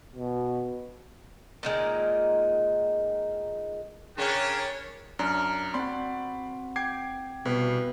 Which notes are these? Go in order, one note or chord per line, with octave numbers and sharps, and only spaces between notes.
B2
A#2 D#3 G#3
C#3 D4 G#4 A#4 C#5 G5
F#2 D4 A#5 F6
C4 F#4 D5 B5 C6
G5 D6 G#6 C7
C2 B2 B4